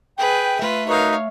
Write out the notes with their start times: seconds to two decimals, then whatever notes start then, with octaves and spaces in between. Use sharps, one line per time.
0.18 G#4 B4 G5
0.59 A3 F4 B4 E5
0.88 D#4 F#4 A#4 B4 C#5 F5